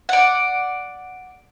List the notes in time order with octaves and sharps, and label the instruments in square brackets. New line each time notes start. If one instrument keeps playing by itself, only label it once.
[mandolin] D5 F#5